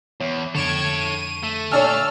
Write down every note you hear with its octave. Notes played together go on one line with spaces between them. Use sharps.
E2 C#5
F2 D3 A4 C#5 G#6 D7 E7
D#7
A3
A#2 D4 C#5 A5 E6 F6